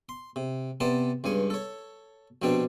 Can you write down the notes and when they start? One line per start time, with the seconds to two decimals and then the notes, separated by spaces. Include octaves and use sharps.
0.09 C6
0.36 C3
0.80 C3 B3 C5 D5 A5
1.24 C#2 G2 G#5 C#6
1.50 A4 C#5
2.42 A#1 B2 C4 D4 G4 D5